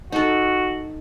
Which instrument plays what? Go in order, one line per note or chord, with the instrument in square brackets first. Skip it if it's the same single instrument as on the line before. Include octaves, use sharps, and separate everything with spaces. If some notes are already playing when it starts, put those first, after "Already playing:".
[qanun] D#4 A4 [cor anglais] F#4